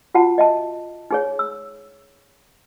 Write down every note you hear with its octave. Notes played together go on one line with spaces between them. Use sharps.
F4 F#4 F#5 A5
D#5 E5 A5
D#4 G#4 C#5
E6